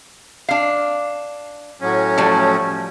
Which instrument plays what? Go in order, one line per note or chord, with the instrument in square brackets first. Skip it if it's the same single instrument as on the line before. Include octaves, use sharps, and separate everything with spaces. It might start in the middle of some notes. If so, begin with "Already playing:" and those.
[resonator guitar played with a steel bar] D4 F5
[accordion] A2 F#3 C#4
[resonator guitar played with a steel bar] F3 G3 A3